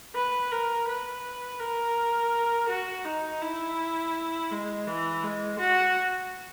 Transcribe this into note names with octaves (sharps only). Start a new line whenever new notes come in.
B4
A#4
B4
A#4
F#4
D#4
E4
G#3
E3
G#3
F#4